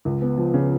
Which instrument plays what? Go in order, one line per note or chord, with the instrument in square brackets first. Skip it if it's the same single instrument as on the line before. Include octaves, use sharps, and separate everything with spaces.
[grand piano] C#2
B3
F3
C#3